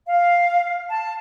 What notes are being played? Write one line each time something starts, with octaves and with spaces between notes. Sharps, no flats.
F5
A5